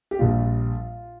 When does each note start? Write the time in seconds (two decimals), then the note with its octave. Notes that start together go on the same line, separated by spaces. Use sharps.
0.11 G4
0.19 A#1 A#2 G3 F4